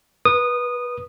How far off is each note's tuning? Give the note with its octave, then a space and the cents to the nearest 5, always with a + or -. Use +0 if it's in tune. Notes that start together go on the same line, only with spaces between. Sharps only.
B4 -20 D#6 -15